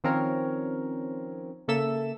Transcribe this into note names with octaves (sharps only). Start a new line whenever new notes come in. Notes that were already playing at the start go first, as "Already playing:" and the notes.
D#3 F3 C4 C#4 A#4 C#5
C#3 A#3 A4 E5 E6 E7